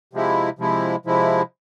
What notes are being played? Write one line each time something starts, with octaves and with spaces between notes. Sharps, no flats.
C3 F3 G#3 E4
C3 F3 G#3 E4
C3 F3 G#3 E4